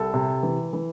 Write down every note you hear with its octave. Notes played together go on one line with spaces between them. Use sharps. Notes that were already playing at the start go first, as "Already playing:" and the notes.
Already playing: C2 A4
C3
E3
E3